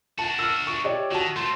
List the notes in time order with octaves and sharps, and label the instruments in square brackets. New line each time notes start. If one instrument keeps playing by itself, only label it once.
[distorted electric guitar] D4 F#4 [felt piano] A5
[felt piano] E6 F6
C#6
G4 C#5 D5
[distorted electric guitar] D#3 [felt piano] F#4 A5
[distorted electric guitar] A3 C4 [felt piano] C6